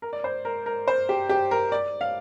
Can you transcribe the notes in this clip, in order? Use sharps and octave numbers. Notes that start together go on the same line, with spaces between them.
A#4
D5
C5
A#4
A#4
C5
G4
G4
A#4
D5
F5